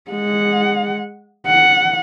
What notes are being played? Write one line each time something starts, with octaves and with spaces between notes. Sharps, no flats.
G#3 F#5
F#5